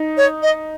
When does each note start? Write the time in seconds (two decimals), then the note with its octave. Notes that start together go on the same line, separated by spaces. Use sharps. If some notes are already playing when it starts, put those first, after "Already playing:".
Already playing: D#4
0.17 C#5
0.42 D#5